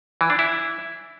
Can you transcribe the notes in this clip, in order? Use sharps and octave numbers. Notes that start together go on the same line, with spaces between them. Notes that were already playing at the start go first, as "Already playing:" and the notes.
E3
D4
E4